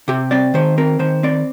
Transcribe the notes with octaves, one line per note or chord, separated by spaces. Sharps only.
C3 G4
C4 D5
D#3 C5
C4 A#4
D#3 C5
C4 D5